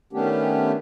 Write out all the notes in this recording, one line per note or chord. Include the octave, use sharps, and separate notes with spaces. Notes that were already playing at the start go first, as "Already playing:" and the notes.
D#3 A3 B3 C#4 D4 G4